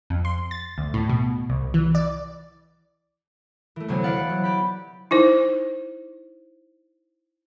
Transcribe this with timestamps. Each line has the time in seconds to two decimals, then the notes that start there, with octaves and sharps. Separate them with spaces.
0.10 F2
0.25 C6
0.51 A6
0.78 D2
0.94 A2
1.09 B2
1.49 C2
1.74 E3
1.95 D5
3.76 E3 A3
3.88 D2 C3 F#3 B3 G#5
4.03 E3 B4 D5 F5 F#5 A6
4.17 F#6
4.30 F#3
4.44 G4 G5 B5
5.11 D#4 E4 C5